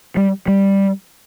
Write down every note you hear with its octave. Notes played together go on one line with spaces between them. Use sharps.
G3
G3